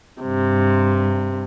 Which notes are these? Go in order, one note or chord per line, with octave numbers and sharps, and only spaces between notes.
G2 C3